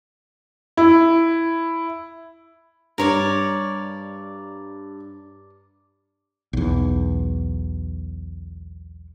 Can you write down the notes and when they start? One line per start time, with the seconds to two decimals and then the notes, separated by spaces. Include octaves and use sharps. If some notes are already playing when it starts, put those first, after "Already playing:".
0.77 E4
2.98 G2 A#4 C#5 D5
6.53 B1 E2